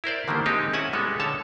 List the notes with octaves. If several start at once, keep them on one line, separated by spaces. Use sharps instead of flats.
E4 A#4 C5 D5
D3 D#3 G3 A#3
G#3 C4 D#4 G4
C#4 E4 F#5 G#5 A5
G3 G#3 B3 E4 A4
D3 A4 C#5 A5